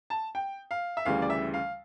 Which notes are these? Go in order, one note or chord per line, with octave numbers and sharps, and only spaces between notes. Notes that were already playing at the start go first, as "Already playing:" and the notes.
A5
G5
F5
E5
D2 C#3 E3 G3 F5
D5
E5
F5